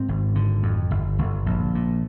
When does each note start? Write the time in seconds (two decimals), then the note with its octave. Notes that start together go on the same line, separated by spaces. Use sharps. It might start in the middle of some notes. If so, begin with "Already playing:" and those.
Already playing: G#2 C4
0.08 G#1
0.35 D3
0.63 F2
0.91 G1
1.18 G1
1.46 A#1
1.75 A#2